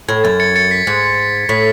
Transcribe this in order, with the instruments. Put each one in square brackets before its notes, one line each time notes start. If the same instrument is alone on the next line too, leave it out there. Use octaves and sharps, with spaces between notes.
[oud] A2 [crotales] G#6
[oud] F#2 [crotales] A6
[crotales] A6 C#7
A6 C#7
B6
[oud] G#2
[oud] A2 [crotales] B6